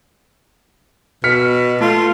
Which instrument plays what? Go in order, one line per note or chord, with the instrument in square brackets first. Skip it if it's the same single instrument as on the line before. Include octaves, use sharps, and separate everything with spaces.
[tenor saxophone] B2 [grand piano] F6 B6 C#7
[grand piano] A3 [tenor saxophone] F4